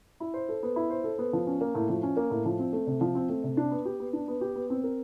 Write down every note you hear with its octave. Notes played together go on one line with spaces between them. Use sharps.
E4
C5
A4
B3
E4
C5
A4
B3
F3
C#4
A#3
A2
F3
C#4
A#3
A2
F3
C4
A3
C3
F3
C4
A3
C3
D4
B3
G4
B3
D4
B3
G4
B3
C4
A#4